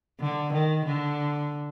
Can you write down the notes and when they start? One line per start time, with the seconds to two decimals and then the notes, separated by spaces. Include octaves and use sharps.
0.20 D3
0.53 D#3
0.85 D3